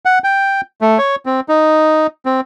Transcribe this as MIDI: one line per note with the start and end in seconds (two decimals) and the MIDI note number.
0.05 0.19 78
0.24 0.61 79
0.81 0.98 57
0.98 1.16 73
1.26 1.40 60
1.49 2.07 63
2.26 2.41 60